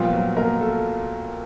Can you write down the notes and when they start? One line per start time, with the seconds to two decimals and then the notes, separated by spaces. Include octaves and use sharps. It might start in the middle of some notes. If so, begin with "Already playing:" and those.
Already playing: A#2 F3 G3 B3 F4
0.13 F#3 F#4
0.37 A#3 A#4
0.60 A3 A4